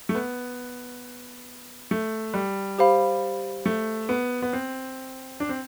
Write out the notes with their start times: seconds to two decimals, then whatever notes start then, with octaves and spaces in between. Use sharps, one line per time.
0.09 A3
0.15 B3
1.91 A3
2.34 G3
2.78 G4 C5 F5 B5
3.66 A3
4.09 B3
4.42 B3
4.53 C4
5.40 D4
5.49 C4